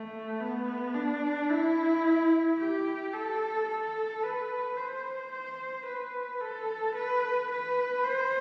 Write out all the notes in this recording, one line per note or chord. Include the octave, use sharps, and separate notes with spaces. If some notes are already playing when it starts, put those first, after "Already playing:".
Already playing: A3
B3
D4
E4
G4
A4
A4
B4
C5
C5
B4
A4
B4
B4
C5